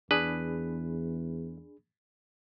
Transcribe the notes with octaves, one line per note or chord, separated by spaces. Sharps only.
E2 D4 G#4 B4 B5